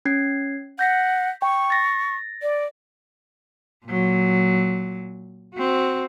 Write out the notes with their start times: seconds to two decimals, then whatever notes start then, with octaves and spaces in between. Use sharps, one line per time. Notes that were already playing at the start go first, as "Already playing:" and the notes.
0.05 C#4 G#6 C7
0.79 F#5 G6 A#6 B6
1.42 G5 C#6
1.70 A6 A#6
2.42 D5
3.86 A#2 F#3
5.54 C4 F#4